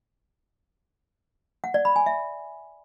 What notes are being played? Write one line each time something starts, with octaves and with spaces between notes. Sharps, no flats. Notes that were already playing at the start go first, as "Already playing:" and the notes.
F#5
D5
B5
G#5
E5